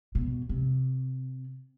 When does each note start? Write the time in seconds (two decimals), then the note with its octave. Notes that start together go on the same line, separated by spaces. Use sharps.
0.15 B2
0.49 C3